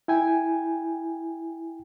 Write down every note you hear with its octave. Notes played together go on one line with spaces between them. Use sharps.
E4 G5 G#5